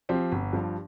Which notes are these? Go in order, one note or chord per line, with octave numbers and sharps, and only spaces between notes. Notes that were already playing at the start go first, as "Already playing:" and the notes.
F3 C4 G4
G1
G2 F3